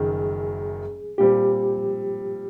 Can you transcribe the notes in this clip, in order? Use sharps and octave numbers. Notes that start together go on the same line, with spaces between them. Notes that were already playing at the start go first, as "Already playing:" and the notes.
Already playing: F#1 F#2 D#3 G#4
A#2 G3 C4 G4